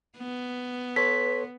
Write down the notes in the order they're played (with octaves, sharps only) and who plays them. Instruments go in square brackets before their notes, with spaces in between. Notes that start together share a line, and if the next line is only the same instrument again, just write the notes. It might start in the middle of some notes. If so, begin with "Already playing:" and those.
[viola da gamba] B3
[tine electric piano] A4 C#5 C6 [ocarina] B4 [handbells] B6